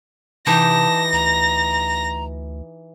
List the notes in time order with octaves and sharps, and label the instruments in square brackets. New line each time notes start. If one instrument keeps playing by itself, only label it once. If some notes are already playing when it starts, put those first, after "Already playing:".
[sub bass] C3 [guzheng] E3 D#4 G4 [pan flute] A5 [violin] A#6
[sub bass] D2 [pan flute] A#5